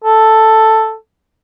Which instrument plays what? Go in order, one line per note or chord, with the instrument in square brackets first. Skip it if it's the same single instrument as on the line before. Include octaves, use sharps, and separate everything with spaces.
[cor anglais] A4